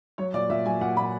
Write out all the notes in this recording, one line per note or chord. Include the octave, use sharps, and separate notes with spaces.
F#3 C#5
A#2 D5
A#2 E5
F#3 G#5
A#2 F#5
A#2 B5